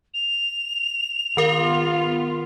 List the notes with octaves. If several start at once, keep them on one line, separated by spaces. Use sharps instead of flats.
F7
D#3 B3 F4 A#4 F5